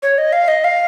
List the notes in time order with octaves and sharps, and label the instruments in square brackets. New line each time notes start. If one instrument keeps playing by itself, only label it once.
[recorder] C#5
D#5
F5
D#5
F5